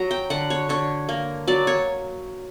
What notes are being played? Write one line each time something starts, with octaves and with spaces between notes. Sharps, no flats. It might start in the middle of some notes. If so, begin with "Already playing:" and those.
Already playing: F#3 A#5
G5
D3 F#5
C#5
D3 C#5
A#3
F#3 D5
C#5